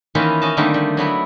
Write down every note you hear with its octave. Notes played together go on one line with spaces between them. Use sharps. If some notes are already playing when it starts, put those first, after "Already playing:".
D#3 E3 A#3 C#4 F4 B4
C#4 F#4 D#5 A5
D3 D#3 G3 A3 A#3 C4
G3
F#3 A3 B3 E4